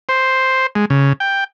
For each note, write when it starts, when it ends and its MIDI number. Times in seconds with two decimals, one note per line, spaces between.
0.09 0.67 72
0.75 0.85 56
0.90 1.13 49
1.20 1.44 79